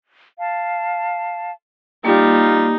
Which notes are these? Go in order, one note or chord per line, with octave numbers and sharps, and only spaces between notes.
F5 A5
G3 A#3 D#4 F4